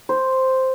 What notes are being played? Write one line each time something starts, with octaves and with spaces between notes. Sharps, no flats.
C5